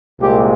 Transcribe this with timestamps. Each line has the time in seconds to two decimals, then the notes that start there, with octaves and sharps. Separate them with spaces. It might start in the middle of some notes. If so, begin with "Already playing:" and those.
0.20 C2 A#2 G#3 C4 G4